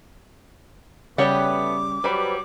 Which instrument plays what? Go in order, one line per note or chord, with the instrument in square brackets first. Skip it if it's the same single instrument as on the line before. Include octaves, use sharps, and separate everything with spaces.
[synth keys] C#3 G3 [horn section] A3 B3 [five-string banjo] G4 C#5 F#5 [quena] D6
[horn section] F#3 G3 [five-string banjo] B4 C5 B5